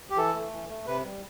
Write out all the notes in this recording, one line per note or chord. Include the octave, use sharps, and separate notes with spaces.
G4
E3 A4
A3
E3
A3
C3 B4
G3